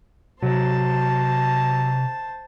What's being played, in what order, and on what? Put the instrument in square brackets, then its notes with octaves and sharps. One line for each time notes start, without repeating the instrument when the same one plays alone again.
[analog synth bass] C3 [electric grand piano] F#3 [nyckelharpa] C5 A5